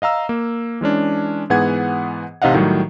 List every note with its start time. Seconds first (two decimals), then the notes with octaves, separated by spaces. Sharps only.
0.02 D#5 F5 A#5 E6
0.29 A#3
0.81 E3 G#3 C#4 D4
1.50 G#2 E3 B3 G#4 F#5 G#6
2.42 A1 C3 D#4 D#5 F5 F#5
2.54 A2 D#3 F#3 G3